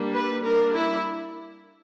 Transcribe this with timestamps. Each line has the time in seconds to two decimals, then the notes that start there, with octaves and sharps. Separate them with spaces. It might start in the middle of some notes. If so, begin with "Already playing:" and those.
Already playing: G3 A#3 D4
0.14 B4
0.45 G3 A#3 D4 A#4
0.75 E4